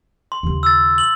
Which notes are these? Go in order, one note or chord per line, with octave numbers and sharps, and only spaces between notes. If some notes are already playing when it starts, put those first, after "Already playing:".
C6
D#2 C#3
E6 A6
F#7